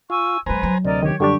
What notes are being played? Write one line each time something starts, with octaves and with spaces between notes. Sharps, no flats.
F4 G#5 C#6 E6
F#3 G#3 B4 C5 G#5 A#5
F#3
D2 C3 A#4 D5 D#5
D#3 G4 C#5
F#2 D3 G3 D4 G4 C#6